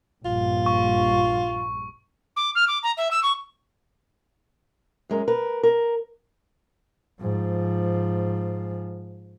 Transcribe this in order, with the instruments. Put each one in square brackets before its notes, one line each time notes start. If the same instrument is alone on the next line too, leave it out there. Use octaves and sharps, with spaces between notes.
[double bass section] A#1 G2 [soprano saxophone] F4
[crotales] C#6
[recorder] D6
F6
D6
A#5
E5
E6
C#6
[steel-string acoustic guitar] F#2 G#3 A#4
A#4 B4
A#4
[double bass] G#2 F3